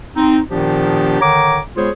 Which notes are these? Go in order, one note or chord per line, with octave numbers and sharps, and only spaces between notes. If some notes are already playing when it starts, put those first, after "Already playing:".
C4 D#4
A#2 D#3 F3 B3 D4 G4
D3 D#3 C#5 A#5 D6
G#3 B3 F4 G#4 C5 C#5